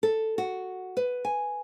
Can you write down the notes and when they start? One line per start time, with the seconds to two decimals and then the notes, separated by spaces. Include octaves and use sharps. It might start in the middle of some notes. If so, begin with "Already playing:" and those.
0.03 A4
0.38 F#4
0.97 B4
1.25 G#5